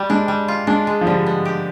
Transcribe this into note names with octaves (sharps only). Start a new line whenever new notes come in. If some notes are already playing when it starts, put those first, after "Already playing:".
Already playing: G3
G#3 D4
G3
F4
G#3 D4
G#3
F3
D3 G3
B3
G4